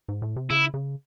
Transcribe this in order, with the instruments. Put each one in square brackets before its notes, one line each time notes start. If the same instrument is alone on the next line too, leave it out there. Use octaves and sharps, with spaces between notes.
[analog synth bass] G#2
A2
C3
[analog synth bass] C#3 [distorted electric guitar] E4
[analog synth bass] C#3